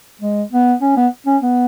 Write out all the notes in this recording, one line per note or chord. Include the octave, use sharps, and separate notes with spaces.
G#3
B3
C#4
B3
C#4
B3